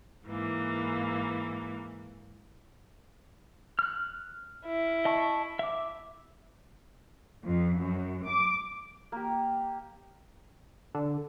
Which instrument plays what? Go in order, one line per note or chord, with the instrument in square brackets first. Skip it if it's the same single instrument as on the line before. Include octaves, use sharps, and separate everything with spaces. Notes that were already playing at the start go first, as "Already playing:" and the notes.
[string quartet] G#2 E3 A#3
[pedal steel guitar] F6 F#6
[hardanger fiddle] E4
[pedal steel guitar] D#5 A5 C#6
E5 D6
[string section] F2
F#2
D6
[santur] A#3 G4
[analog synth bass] D3